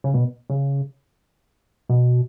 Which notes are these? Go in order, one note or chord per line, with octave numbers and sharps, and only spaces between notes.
C#3
B2
C#3
B2